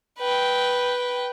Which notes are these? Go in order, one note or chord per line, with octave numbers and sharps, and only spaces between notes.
B4 G5